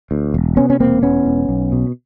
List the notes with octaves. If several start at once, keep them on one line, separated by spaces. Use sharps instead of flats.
D2
E1
C3 B3 C#4
C#4
E1 A#3 C4
E2 B3 C#4
E1
B1
B2